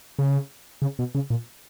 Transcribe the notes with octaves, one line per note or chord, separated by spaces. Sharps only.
C#3
C#3
B2
C#3
A#2